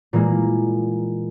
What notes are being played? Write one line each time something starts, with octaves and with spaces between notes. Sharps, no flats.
A#2 E3 G#3 A#3